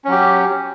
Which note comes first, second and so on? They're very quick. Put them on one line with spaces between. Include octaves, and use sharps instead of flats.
C#4 F#3 G4